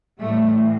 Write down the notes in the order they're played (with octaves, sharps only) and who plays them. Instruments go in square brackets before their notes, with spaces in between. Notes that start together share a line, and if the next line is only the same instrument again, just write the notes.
[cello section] A2 E3 G3 A3